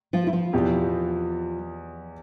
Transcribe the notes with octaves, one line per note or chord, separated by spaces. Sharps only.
F3 F4
E4
F3 F4
E2 B2 B3 E4 G4